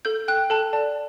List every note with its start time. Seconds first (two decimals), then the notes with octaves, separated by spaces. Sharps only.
0.05 A4 G6
0.28 G5 F#6
0.50 A4 A5
0.73 D5 A5